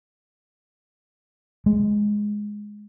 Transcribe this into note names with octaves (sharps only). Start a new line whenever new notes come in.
G#3